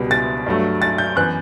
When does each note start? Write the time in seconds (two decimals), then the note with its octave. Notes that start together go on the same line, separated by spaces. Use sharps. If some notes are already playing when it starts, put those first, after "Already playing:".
Already playing: C#2 B2 G3 B3
0.11 A6
0.46 G2 F#3 A3
0.82 A6
0.98 G6
1.16 F#2 E3 B3 F#6